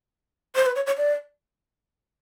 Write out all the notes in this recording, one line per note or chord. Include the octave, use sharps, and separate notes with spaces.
C5
B4
C#5
C#5
D5